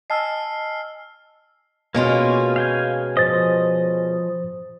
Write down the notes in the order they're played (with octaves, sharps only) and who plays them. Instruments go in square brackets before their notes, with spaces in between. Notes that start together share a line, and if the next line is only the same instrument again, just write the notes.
[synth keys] D#5 G#5 A5 [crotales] E6 F6 C7
[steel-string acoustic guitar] B2 G#3 C#4 [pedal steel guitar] A#3 F4
[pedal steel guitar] F5 G5 G#5
[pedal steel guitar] F3 D#5 [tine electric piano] C5 A6